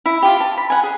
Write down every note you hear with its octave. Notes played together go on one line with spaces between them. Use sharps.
E4
F4 G4
A5
B5
F#5 G#5
G#4